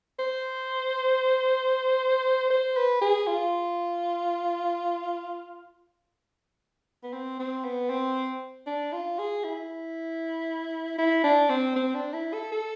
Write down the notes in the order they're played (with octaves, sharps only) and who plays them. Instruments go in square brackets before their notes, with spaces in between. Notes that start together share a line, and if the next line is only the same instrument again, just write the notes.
[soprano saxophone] C5
C5
B4
G#4
F4
B3
C4
C4
B3
C4
D4
F4
G#4
E4
E4
D4
C4
C4
D4
E4
A4
A4